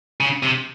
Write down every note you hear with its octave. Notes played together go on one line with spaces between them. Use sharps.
C#3
C3